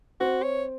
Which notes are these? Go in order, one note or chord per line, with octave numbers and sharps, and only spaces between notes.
C4 F#4
C#5